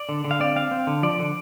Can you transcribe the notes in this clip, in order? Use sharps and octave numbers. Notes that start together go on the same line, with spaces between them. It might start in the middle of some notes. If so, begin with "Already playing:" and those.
Already playing: D5
D3
D3
F5
C4 D5
C4 F5
C4
D3
F3 D5
D3